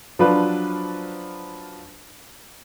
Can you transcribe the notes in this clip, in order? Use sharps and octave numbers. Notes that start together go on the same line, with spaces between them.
F3 F#3 D4 F4 B4